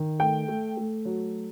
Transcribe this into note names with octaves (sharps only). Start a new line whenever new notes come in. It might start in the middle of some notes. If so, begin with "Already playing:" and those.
Already playing: D#3
A3 G5
A3
A3
F#3